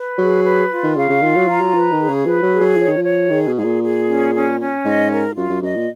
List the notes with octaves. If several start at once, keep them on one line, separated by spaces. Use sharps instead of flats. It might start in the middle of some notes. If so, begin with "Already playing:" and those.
Already playing: B4
F#3 G#4
B4
F4
D#3
C#3 F5
C#3
D#3 F4
F#3
F3 A#5
F#3
F3 B4
D#3
G#4
C#3
F3 B4
F#3
G#4
F#3
F3 C#5
D#3
F3
C#5
D#3 G#4
B2
G#2 G#4
A#2
G#4
C#4
C#4
C#4
G#2 D#5
A#4
F#2 F4
F#2
F#2 D#5
A#2